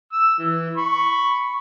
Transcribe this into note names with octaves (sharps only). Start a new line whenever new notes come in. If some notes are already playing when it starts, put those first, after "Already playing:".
E6
E3
B5 C#6